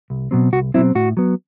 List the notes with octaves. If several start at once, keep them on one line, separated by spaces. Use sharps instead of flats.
C2
B2 F#3 C4
C2 F#4
B2 F#3 C4 E4
A2 F#4
F#3 B3